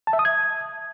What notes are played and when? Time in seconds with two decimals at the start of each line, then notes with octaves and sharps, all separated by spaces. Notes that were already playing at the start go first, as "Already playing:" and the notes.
0.07 A5
0.13 E5
0.19 D#6
0.25 G#6